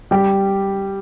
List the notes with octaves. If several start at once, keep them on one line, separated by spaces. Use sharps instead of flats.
G3 G4